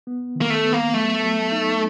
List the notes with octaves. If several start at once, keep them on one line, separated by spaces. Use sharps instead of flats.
B3
D#3
A#3
A3
B3
A#3
F#3 A3
F#3
D#4